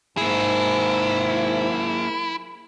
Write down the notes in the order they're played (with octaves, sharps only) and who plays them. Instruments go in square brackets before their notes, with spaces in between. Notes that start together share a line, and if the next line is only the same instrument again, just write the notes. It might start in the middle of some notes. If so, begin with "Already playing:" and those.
[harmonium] G#2 [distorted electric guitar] A#3 G#4 [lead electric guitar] E4